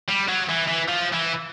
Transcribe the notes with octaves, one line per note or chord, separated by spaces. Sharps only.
G3
F#3
E3
E3
F3
E3